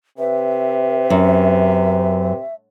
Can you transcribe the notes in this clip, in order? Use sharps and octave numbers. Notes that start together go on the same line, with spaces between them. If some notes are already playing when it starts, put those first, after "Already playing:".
C3 B4 E5
F#2